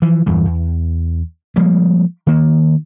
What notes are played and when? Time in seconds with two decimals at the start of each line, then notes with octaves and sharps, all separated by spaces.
0.02 E3 F3
0.26 E2 G2 E3
0.45 E2
1.56 F3 G3 G#3 A#3
2.27 D#3 A#3